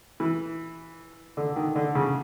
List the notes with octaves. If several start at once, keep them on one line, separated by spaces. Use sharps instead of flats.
E3
D3
D#3
D3
C#3